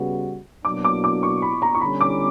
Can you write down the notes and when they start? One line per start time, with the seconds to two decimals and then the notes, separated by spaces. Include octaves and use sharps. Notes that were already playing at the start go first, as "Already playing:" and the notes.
Already playing: C#3 G3 B3 F#4
0.65 B2 F#3 A#3 D4 D6
0.84 D6
1.04 D6
1.23 C#6
1.42 B5
1.62 A#5
1.75 C#6
1.81 D3 G3 C#4 B5
2.01 D6